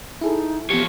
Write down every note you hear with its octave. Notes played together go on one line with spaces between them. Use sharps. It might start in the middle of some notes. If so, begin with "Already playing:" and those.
D#4 E4 G#4 A4
E3 F3 B3 G4 C#5